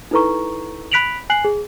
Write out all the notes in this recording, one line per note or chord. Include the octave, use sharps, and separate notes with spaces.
D#4 E4 A4 B4 A#5 C#6
B5 F#6 B6 D7 F7 F#7
G#5 F#6 C7 F#7
G#4